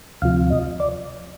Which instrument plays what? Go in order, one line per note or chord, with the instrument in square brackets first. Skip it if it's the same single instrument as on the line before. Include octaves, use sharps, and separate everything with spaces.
[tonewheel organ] D2 C3 F3 F5
D#5
D5